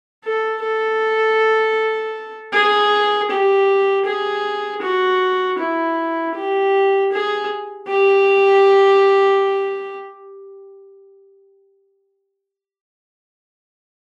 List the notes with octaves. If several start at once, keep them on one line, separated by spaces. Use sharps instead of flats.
A4
A4
G#4
G4
G#4
F#4
E4
G4
G#4
G4